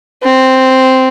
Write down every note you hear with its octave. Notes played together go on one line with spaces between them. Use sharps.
C4